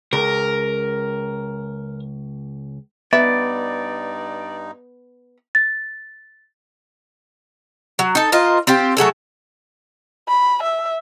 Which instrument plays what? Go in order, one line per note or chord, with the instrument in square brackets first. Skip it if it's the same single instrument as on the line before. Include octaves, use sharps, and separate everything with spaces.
[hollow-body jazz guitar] C#2 [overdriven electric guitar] A#4
[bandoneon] G2 D#4 [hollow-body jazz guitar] B3 [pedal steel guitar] D5 [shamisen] E5
[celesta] A6
[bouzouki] F#3
D#4 A4
F4 A#4 C5 D#5
C4 F4 G4
F#3 A3 G#4 A4
[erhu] B5
E5